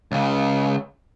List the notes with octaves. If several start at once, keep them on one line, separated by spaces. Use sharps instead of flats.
C#2 C#3